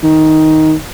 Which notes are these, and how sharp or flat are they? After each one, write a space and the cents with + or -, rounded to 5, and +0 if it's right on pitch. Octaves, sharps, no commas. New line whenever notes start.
D#3 +10